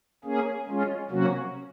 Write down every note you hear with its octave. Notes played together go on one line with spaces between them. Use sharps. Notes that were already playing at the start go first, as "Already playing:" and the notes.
A#3 C#4 G#4
G#3 C#4 F4
C3 F#3 A#3 C#4 F#4